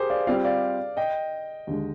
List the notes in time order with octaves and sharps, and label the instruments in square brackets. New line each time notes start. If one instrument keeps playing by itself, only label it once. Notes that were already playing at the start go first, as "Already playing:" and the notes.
Already playing: [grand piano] G4 G#4 A#4 C5
D5 F5
[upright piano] G3 C4 F4 [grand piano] D5 F5
[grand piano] D5 F5
D#5 G5
[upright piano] D#2 D3 G#3